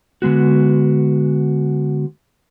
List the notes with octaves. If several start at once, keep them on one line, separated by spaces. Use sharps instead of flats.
D3 G#3 B3 F#4